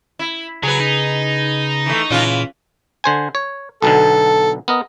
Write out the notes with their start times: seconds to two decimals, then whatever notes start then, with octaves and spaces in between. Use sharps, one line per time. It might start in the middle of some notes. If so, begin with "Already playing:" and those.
0.19 E4
0.63 C#3 F#3 G#4 B4
0.80 D#4
1.86 E3 A3
2.10 A#2 C#3 E3 F4
3.04 D3 C5 G#5
3.35 C#5
3.82 B1 B2 D3 A4
4.68 B3 A#4 D#5